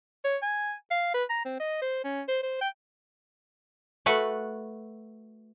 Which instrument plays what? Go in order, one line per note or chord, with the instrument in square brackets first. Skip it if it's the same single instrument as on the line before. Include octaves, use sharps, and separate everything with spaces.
[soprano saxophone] C#5
G#5
F5
B4
A#5
C4
D#5
C5
C#4
C5
C5
G5
[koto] A3 F#4 B4 F#5